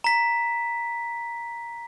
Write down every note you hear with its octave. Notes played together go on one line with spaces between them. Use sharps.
A#5 B6